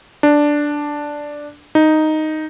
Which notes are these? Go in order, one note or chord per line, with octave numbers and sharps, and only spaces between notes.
D4
D#4